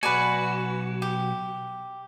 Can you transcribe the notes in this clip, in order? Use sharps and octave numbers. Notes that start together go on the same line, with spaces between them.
B1 F#4 B4 D5 G#5
G4